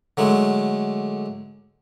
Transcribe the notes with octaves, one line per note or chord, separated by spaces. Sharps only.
D3 F#3 G#3 A3